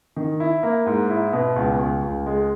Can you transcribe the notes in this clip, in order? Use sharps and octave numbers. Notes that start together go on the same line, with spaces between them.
D#3
E4
A#3
G#2
E4
B2
C#2
C#2
C#2
G#3